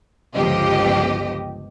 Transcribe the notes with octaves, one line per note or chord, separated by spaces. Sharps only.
G1 C#2 F3 G4 D#5